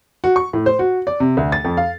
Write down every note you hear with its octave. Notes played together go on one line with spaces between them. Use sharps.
F#4
C#6
A2
C5
F#4
D5
C3
D2
A6
F2
F5